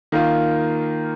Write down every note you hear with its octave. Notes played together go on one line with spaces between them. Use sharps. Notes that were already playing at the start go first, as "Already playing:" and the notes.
D#3 A#3 F4